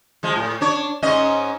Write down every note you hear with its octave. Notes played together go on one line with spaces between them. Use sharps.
F3 G#3
A2
D4 C#5
G#2 C#4 D#5